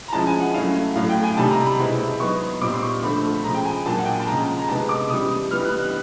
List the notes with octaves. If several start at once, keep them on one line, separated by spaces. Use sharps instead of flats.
A#5
F3 G#3 C#4 E4 A5
G#5
F#5
F#3 A3 C#4 E4 F5
A2 F#3 A3 F5
G5
G#5
C3 D#3 G3 A5
A#5
B5
B2 G#3 C4 E4
F#3 B3 D#4 C#6
A#2 G3 C4 D#4 D6
C6
C#6
D3 F3 A3 C4 B5
B5
C#3 F3 G#3 A#5
G5
G#5
A#2 F#3 A#3 D#4 A5
F#5
G5
G#5
A5
C#3 F3 G#3 A#5
A#5
C3 D#3 G#3 B3 A5
D6
C#3 E3 G3 D#6
E3 G3 B3 D#4 F6
F#6
F#6